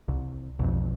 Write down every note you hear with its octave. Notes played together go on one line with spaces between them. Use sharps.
C2
B1 F2